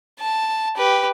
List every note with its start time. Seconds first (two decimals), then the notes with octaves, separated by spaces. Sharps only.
0.20 A5
0.77 G4 B4